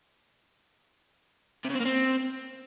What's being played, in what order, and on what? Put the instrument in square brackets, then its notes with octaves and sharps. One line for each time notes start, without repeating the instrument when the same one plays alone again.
[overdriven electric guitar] C3
C#3
C4
A#3
C4